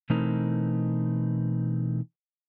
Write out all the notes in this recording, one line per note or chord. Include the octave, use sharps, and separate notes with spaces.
B2 E3 A3 C4 D#4 A#4